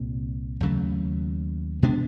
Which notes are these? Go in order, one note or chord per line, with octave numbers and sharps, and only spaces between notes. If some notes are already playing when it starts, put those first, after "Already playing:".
Already playing: C2 A#2 G3 C4
D#2 C#3 F#3 A3
B2 G#3 B3 D4